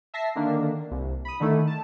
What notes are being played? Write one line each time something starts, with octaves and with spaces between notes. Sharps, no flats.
E5 A5 A#6 C7
D3 D#3 A#3 D4
C2
B5 D#6
D3 D#3 A3 E4
A5